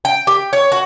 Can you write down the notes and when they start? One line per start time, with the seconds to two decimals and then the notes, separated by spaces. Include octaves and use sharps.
0.05 G5
0.27 G4
0.53 C#5
0.72 F#4